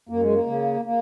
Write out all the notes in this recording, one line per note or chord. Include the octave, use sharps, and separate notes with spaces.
F#2 A#3
G#3
A#3
C#3
A#3